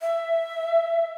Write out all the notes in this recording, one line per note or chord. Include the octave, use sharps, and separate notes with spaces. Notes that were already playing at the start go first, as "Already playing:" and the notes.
E5